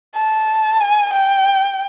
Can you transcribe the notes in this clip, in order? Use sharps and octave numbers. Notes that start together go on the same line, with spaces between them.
A5
G#5
G5